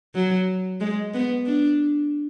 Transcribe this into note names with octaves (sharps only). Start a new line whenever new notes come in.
F#3
G#3
B3
D4